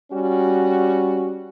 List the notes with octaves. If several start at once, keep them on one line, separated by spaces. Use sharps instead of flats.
G3 C#4 F#4